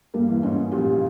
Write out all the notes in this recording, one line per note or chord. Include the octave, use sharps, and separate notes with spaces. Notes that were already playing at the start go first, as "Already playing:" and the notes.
G2 G3 A#3
E2 E3
G#2 C#4
G#2
A#1 A#2 G4
C#3